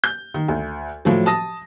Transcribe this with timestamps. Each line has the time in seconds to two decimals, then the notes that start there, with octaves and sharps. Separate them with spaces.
0.04 G6
0.34 D#3
0.48 D2
1.05 A2 F3 F#3
1.26 A5 D#6 A#6